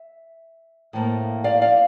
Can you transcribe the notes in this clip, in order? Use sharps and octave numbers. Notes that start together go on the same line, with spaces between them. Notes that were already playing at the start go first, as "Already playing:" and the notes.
Already playing: E5
A2 F3 A#3
D5 F5
D5 F5